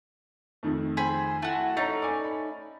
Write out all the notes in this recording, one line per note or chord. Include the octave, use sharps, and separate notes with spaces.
F2 D#3 A3
G#4 C5 B5
A3 E4 F#4
A3 C#4 D#4 A#5 A6
D5 G#5
B5